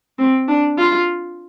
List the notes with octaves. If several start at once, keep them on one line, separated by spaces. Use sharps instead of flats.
C4
D4
F4